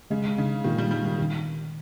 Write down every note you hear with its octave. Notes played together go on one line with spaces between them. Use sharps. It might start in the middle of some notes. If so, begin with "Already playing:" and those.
C#3 G#3
C#3 D#4
A#2 D#3
G3
G3 D#4
D#3
D#3